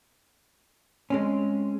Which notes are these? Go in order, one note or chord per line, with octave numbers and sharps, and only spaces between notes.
G#3 C4 C#4